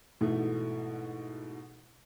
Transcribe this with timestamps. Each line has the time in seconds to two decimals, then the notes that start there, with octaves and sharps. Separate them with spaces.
0.21 G#2 B2 E3 A3